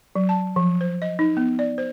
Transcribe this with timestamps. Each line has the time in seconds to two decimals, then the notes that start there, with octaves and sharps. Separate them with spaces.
0.16 F#3
0.29 A5
0.56 F3
0.81 C5
1.02 D#5
1.19 D#4
1.37 B3
1.59 D5
1.78 C5